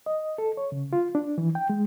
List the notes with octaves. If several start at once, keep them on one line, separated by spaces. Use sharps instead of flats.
D#5
A4
C#5
C#3
F4
D4
E3
G5
G#3